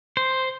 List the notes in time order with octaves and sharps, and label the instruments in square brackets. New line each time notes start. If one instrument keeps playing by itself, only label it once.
[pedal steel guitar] C5